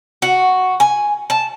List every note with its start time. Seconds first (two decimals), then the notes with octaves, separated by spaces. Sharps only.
0.22 F#4
0.80 G#5
1.30 A5